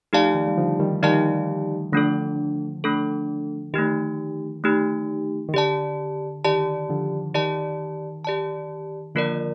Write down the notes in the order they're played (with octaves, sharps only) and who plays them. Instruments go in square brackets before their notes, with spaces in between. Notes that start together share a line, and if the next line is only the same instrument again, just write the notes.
[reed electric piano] F3 A3 [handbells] D#4 G4 D5 F5 A5
[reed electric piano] D#3
G3
D3 F3
D#3 G3
[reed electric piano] D#3 G3 [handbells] D#4 G4 D5 F5 A5
[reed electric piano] D3 F3 [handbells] A3 D4 A4
[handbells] A3 D4 A4
[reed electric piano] D#3 [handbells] A3 D#4 G4
[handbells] A3 D#4 G4
[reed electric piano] D#3
[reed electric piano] D3 [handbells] G4 D5 A5
[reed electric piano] D#3 [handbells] G4 D5 A5
[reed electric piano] D3 F3
[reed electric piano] D#3 [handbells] G4 D5 A5
[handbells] G4 D5 A5
[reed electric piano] D3 F3 [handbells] A#3 F4 A#4 D5